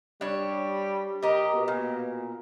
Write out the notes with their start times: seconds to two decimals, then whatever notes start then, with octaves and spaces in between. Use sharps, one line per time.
0.21 G3 D4 C#5
1.23 G4 A#4 D#5
1.54 B2
1.68 A#2